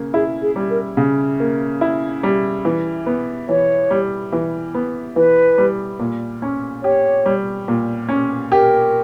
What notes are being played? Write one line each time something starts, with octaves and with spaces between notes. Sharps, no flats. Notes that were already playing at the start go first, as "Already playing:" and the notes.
Already playing: C#3 A#3
E4 G#4
G#4
G3
A#4
C#3
A#3
E4
G3
E3
B3
E3 C#5
G3
E3
B3
E3 B4
G3
A#2
C#4
G4 C#5
G3
A#2
C#4
G4 A#4